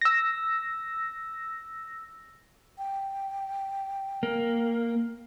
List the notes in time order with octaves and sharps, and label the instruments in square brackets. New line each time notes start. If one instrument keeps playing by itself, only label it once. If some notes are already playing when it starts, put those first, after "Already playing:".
[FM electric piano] E6 A#6
[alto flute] G5
[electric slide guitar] A#3